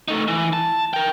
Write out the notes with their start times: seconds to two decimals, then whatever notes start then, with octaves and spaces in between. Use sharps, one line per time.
0.08 A3 D#4
0.28 E3
0.53 A5
0.94 A#4 G5